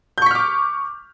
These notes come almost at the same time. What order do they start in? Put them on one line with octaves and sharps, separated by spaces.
G6 C#6 B6 F6 D6